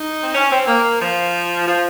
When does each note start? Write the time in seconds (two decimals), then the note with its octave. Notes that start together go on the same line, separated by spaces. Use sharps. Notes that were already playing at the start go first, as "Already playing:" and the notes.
Already playing: D#4
0.22 C4
0.33 C#4
0.49 C4
0.66 A#3
1.00 F3
1.67 F3